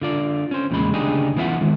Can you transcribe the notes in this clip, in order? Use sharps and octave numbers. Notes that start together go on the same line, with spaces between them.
D3 F4 D5
C#4 C5
E2 A#2 C#3 G#3 B5
D2 C#3 D4 D#4 G4 G#4
C2 E3 B3 F4 E5 F#5
D#3 G#3